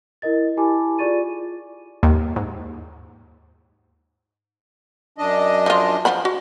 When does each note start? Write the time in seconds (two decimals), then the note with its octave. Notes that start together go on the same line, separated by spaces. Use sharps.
0.22 E4 A#4 D#5 A6
0.57 E4 G4 G#5 A5 B5 D6
0.98 F4 G#4 D5 C#6 A6 D#7
2.03 D#2
2.36 G#2
5.18 F#2 D4 D#5
5.66 F3 F4
6.05 F3 F#5 B5
6.25 F#4